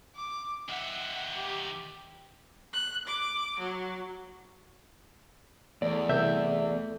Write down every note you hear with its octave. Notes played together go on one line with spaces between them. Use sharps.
D6
D#3 E5 F#5
G4
F#6
D6
F#3
E2 A3 D5
C2 E5 G6